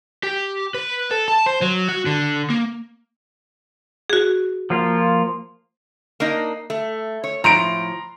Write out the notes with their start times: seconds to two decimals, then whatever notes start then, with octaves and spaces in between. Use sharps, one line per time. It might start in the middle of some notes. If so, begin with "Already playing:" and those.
0.23 G4
0.74 B4
1.11 A4
1.28 A5
1.46 C5
1.62 F#3
1.89 F#4
2.06 D3
2.50 A#3
4.10 F#4 G#4
4.70 F3 A#3 F4
6.20 A#3 D4 D#4
6.70 A3
7.24 C#5
7.44 A2 F3 A#5 C6 D7